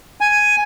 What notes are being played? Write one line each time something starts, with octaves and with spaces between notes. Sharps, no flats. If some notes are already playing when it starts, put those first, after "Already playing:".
G#5